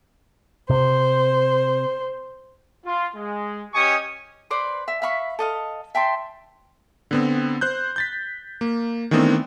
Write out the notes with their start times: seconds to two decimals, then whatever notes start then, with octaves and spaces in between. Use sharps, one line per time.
0.70 C3 C5
2.85 F4
3.15 G#3
3.74 C#4 G4 D#5 G#5 C#6 D#6
4.50 B4 C5 D5 C6
4.88 E5
5.02 E5 F5 B5 C#6
5.39 A4 D#5 F5
5.95 E5 G5 A5 C6
7.11 D3 B3 C4
7.61 C5 F#6 G6
7.96 G6 A6 B6
8.61 A#3
9.11 D#3 E3 A3 B3 C4 D4